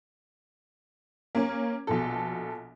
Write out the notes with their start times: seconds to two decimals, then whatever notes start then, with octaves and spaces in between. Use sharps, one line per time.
1.35 A#3 C#4
1.87 A#1 B2 A4